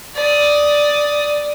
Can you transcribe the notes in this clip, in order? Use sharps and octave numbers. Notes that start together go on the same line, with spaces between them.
D5 D#6